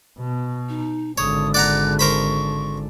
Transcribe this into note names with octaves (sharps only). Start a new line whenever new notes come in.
B2
D#4
G#1 D3 C#5 D#6
D5 F#5 A#5 F#6
A#4 C5 B5 C#6